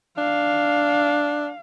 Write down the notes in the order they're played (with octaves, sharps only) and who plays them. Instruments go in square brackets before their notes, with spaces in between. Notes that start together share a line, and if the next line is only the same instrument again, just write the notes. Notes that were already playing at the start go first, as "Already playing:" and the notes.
[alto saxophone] D4 [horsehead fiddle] F5